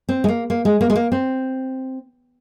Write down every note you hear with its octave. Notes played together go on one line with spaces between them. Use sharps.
C4
G#3
A#3
A#3
G#3
A#3
G#3
A#3
C4